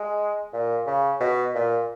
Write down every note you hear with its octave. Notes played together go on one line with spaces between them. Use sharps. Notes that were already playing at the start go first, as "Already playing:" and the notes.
Already playing: G#3
A#2
C#3
B2
A#2